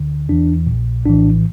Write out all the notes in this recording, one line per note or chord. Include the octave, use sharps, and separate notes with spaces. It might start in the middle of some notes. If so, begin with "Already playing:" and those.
Already playing: D2 D3
E2 E3 D4
A#1 A#2
A#1 A2 E3 D4